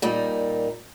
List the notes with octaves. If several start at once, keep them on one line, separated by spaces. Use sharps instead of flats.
A#2 G3 A#3 D#4